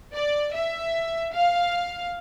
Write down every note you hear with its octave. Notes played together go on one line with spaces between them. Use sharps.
D5
E5
F5